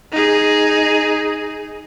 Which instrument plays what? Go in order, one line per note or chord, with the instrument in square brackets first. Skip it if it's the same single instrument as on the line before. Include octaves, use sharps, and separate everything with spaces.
[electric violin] D#4 G#4